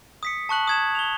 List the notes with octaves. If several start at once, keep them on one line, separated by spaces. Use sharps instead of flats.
D#6 B6 C#7
A5 C#6 F#6 F#7
D#6 G#6 E7
F7 G7